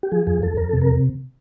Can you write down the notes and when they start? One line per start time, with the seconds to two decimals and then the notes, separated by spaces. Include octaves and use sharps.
0.03 G4
0.12 F3 G#4
0.27 F2 G#4
0.43 F2 A4
0.57 F2 A#4
0.69 C3 A4
0.81 A#4